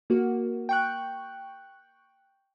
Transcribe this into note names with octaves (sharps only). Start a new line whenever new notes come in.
A#3 F#4
G5 C#6 F#6